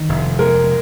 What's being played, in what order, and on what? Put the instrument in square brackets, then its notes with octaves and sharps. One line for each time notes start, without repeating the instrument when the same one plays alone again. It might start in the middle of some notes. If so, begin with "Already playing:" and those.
Already playing: [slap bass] D#3
F1
[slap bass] G#3 [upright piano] A#4